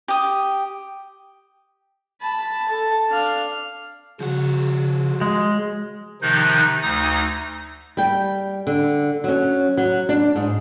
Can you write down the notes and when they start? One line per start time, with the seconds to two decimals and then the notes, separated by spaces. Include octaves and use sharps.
0.08 G4 D#6
2.21 A5 B5
2.69 A4 A5
3.09 D4 F5
4.21 C#3 F3 F#4
5.21 G#3
6.22 C3 D#3 F3 D#4 F#6 G6
6.83 D2 D#4 D#6
7.97 G3 G5
8.67 D3
9.24 F#3 C#4
9.77 F#3
10.09 D4
10.36 G#2